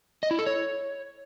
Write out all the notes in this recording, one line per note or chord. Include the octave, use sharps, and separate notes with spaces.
D#5
E4
A4
C#5